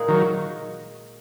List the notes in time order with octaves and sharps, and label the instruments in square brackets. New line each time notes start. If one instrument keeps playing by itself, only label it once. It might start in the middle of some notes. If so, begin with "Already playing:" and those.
Already playing: [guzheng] A#2 G#3 D#4 G#4
[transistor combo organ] D#3 F#3